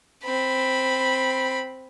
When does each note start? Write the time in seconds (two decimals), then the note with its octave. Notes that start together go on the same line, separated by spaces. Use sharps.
0.24 C4 B5